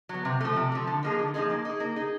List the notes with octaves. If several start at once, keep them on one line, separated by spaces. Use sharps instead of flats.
F#3 B3
C3
F3 A3
C3
F3 A3
D3
F3 A#3 D#4 G#4
D3
F3 A#3 D#4 G#4
A#3
D#4 G#4
A#3
D#4 G#4